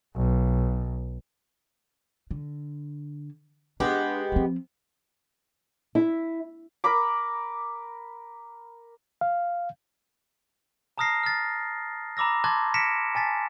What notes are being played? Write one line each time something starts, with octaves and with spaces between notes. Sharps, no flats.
B1
D3
G#3 B3 D4 G4
F3 C4
E4
A#4 A#5 B5 D6
F5
A5 A#5 D#6 F6 A#6 C7
F6 A6
A#5 B5 D6 E6 A#6
A5 C6 D6 F#6 G#6 A6
F6 A#6 B6 C#7 D7 E7
G#5 A5 A6 B6